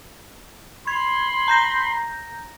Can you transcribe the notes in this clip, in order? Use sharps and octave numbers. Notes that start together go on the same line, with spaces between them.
B5 C6 G#6
A#5 G6 A#6